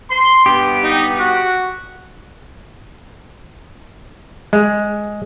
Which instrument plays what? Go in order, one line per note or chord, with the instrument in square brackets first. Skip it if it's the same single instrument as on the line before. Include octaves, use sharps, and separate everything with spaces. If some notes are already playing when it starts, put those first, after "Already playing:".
[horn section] C6
[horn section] G2 B3 [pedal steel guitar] G4
[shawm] D#4
F#4
[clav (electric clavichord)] G#3